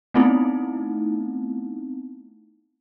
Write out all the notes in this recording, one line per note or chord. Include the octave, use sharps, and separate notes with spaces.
A3 B3 C4 D#4 E4